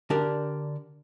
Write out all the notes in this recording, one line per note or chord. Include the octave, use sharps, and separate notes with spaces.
D3 D4 G4 A#4 D5